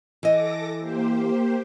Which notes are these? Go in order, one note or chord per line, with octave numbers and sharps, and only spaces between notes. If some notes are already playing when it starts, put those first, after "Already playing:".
E3 A4 D#5 D6 A#6
A#3 G4 C5